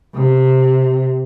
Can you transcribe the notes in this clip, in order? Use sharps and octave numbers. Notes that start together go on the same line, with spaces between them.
C3